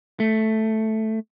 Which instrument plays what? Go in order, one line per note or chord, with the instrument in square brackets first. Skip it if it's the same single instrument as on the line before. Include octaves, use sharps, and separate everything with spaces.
[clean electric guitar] A3